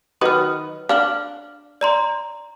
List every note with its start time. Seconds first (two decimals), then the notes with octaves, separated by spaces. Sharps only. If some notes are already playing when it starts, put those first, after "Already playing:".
0.21 D#3 F#3 B4 D#6 F6
0.89 D4 F5 F6 F#7
1.81 D5 A#5 C6